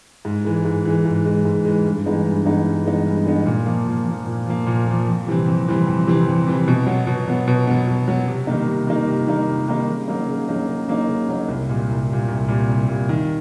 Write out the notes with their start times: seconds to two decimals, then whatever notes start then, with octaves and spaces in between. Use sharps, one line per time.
0.25 G#2
0.45 E3 G#3
0.65 G#2
0.85 E3 G#3
1.05 G#2
1.25 E3 G#3
1.45 G#2
1.65 E3 G#3
1.85 G2
2.06 E3 G#3 B3 D#4
2.26 G2
2.45 E3 G#3 B3 D#4
2.66 G2
2.85 E3 G#3 B3 D#4
3.07 G2
3.25 E3 G#3 B3 D#4
3.46 A#2
3.66 F3 A#3
3.87 A#2
4.06 F3 A#3
4.26 A#2
4.46 F3 A#3
4.67 A#2
4.87 F3 A#3
5.07 F2
5.27 C3 E3 G3 C4
5.46 F2
5.67 C3 E3 G3 C4
5.86 F2
6.07 C3 E3 G3 C4
6.27 F2
6.46 C3 E3 G3 C4
6.68 B2
6.87 F#3 B3
7.07 B2
7.28 F#3 B3
7.48 B2
7.67 F#3 B3
7.87 B2
8.08 F#3 B3
8.28 C3
8.47 D#3 G3 A#3 D#4
8.68 C3
8.87 D#3 G3 A#3 D#4
9.08 C3
9.27 D#3 G3 A#3 D#4
9.47 C3
9.68 D#3 G3 A#3 D#4
9.88 C#3
10.08 F#3 A#3 D#4
10.28 C#3
10.48 F#3 A#3 D#4
10.68 C#3
10.89 F#3 A#3 D#4
11.08 C#3
11.29 F#3 A#3 D#4
11.48 C2
11.69 A#2 G3
11.89 C2
12.09 A#2 G3
12.28 C2
12.48 A#2 G3
12.69 C2
12.89 A#2 G3
13.09 D#3